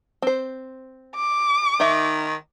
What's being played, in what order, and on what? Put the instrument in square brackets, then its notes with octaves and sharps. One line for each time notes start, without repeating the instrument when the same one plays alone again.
[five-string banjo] C4 C5
[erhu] D6
[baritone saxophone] D#3 [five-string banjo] D#4 E5